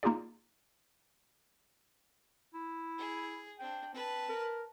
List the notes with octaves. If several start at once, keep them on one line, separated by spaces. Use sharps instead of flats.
A#3 D#4 F4 G4 G#4 D5
E4
G#4
C4 D4 G5
C4 B4 A5
A#4